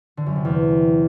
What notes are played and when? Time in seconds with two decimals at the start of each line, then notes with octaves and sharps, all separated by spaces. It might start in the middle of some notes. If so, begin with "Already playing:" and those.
0.17 D3
0.26 F#2
0.36 C3
0.45 E2